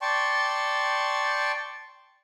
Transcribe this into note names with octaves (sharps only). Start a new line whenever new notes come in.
D5 G5 A5 C6 C#6